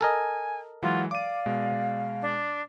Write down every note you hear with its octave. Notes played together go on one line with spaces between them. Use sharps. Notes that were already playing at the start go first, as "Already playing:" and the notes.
A4 A#4 D#5 G#5
E3 F#3 G#3 F4 F#5
D5 F5 D6 D#7
B2 G#3
D4